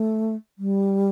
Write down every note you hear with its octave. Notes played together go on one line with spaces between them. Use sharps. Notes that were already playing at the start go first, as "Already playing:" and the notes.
Already playing: A3
G3